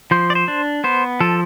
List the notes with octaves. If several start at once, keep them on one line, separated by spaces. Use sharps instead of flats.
F3 C5
D5
C5
D4
B3 C5
F3 A4